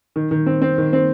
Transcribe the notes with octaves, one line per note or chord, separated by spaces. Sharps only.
D#3
D#3
C4
C4
D#3
C4